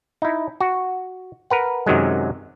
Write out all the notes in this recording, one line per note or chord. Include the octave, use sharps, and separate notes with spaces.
D#4 E4
F#4
A#4 B4 F#5
F#2 C3 D#3 F#3 G#3